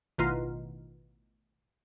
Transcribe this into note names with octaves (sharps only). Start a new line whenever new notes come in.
A1 B2 D#3 F4 C6 F6